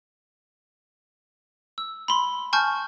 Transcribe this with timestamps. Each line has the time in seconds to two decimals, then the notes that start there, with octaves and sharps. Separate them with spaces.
1.78 E6
2.08 B5 C6
2.53 G#5 A5 C#6 F6 G6